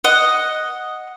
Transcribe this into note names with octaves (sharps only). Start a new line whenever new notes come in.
D#5 F#5